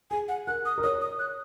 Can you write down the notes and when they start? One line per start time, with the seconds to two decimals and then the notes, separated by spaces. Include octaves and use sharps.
0.11 G#4 G#5
0.28 F#5
0.47 A#4 F#6
0.65 D#6
0.78 A#4
0.83 C#5 D#6
1.01 D#6
1.19 F#6